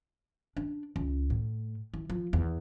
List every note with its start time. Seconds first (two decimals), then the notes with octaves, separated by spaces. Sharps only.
0.57 D4
0.96 C#2
1.30 A2
1.94 E3
2.10 F3
2.33 E2